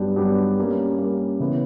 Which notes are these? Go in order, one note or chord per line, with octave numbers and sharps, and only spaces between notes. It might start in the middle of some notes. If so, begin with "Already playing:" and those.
Already playing: G2 F#3 B3 D4 G4
G2 F#3 B3 D4 G4
G3 A#3 C#4
G3 A#3 C#4
C#3 E3 B3